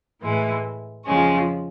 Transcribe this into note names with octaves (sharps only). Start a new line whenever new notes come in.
A2 E3 G#3
F2 C#3 F3 G#3 C#4